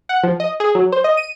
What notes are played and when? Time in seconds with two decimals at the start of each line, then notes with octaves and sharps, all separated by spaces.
0.09 F#5
0.23 F3
0.40 D#5
0.60 G#4
0.75 F#3
0.92 C5
1.04 D#5
1.17 D#7